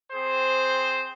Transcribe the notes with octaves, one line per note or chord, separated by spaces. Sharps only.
C4 G#4 C5